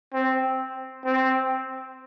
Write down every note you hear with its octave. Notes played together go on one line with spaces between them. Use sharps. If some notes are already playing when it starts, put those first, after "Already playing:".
C4
C4